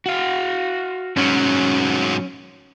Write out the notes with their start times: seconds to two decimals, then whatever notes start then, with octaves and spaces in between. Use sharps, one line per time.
0.06 F#4 F5
1.17 G#2 F#3 C#4